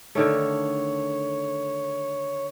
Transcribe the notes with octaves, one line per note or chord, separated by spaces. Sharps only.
D3 D#3 A3 C#5